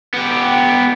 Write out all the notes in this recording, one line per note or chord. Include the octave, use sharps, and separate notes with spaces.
B3 G4